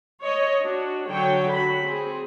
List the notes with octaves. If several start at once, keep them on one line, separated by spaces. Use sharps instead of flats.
C#5 D#5
D4 F#4
D3 F#3 C#5 G5
F#4 B5
C4 G#4